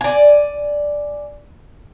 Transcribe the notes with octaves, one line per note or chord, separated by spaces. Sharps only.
D5 G#5